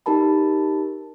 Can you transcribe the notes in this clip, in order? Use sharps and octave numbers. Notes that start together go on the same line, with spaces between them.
D#4 G4 A#4 A5 B5